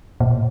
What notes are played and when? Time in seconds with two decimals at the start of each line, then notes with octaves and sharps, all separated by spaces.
0.20 A#2